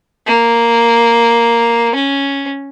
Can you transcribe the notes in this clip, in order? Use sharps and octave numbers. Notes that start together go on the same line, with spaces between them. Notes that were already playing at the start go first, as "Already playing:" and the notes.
A#3
C#4